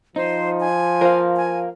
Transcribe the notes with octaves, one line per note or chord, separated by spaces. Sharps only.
F3 D#4 C5
G#5
F4 A#4 C5 F5
G#5